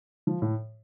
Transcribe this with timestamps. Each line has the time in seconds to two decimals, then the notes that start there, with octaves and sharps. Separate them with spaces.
0.27 F3
0.42 A2